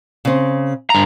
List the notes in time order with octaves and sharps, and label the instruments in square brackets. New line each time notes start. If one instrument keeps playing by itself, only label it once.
[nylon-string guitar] C#3 C4
[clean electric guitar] G2 A#5